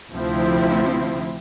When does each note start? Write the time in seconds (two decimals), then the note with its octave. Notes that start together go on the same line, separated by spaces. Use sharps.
0.12 D2 C3 F3 C4 E4